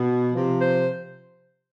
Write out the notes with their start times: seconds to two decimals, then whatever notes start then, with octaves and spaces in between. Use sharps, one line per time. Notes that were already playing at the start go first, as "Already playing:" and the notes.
Already playing: B2
0.33 C3 F3
0.61 C5